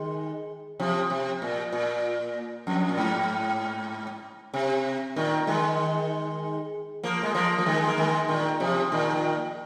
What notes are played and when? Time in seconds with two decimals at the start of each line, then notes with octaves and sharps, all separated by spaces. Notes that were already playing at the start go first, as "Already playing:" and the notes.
Already playing: D#3 G#3
0.80 C3 F3
1.10 C3
1.42 A#2
1.73 A#2
2.67 F2
2.89 A#2
2.98 G#2
4.54 C3
5.16 A#2 D#3
5.47 D#3 G#3
7.04 F3 A#3
7.23 G#3
7.35 F3 A#3
7.58 F3
7.66 D#3 G#3
7.87 A#3
7.98 D#3 G#3
8.29 A#2 D#3
8.60 C3 F3
8.92 A#2 D#3